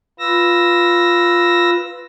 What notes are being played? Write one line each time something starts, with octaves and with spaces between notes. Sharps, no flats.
F4 B4 E6 A#6